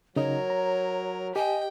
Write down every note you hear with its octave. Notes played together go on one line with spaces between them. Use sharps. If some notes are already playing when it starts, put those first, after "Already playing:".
C#3 F#3 D#4 A#4 C#5 D#5
A#5
G4 D#5 G5 G#5